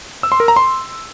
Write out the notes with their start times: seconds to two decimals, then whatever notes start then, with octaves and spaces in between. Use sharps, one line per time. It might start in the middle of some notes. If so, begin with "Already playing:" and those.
0.23 E6
0.32 C6
0.40 A#4
0.48 A#5
0.56 C6